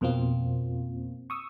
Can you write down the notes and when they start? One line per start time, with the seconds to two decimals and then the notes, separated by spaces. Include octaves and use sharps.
0.01 F2 B2 A#3 C4 F4
1.30 C#6 D#6 E6